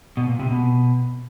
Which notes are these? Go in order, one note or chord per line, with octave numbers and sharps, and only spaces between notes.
B2
A#2
C3
B2